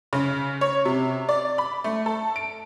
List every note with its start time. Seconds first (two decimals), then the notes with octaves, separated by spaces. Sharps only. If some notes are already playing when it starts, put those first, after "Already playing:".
0.13 C#3
0.61 C#5
0.85 C3
1.29 D5
1.58 B5
1.84 A3
2.06 A4
2.36 D7